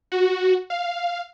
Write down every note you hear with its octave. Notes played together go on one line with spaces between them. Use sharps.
F#4
F5